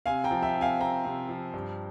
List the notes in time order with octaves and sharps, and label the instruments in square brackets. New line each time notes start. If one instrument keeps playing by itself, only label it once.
[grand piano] C3 F5 G#5
G5 A#5
F3
E5 G5
C3
F5 G#5
C4 G5 A#5
C3
F3
G2